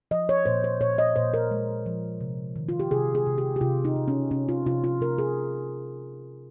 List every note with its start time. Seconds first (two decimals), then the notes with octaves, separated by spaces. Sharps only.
0.11 F3 D#5
0.29 C#5
0.46 A#2 C5
0.64 C5
0.81 A#2 C#5
0.98 D#5
1.16 A#2 C5
1.34 A#4
1.51 G#3
1.86 F3
2.21 C3
2.56 D#3
2.69 F4
2.79 G4
2.91 C3 G#4
3.15 G#4
3.26 C3
3.38 G4
3.56 G4
3.61 C3 F4
3.85 D#4
3.96 C3
4.08 C#4
4.31 C3 C#4
4.49 F4
4.66 C3 F4
4.84 F4
5.01 C3 A#4
5.18 G#4